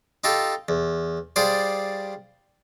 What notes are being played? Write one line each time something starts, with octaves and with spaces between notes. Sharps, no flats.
D#4 F4 G4 A4
E2
G3 F4 G#4 C5 D5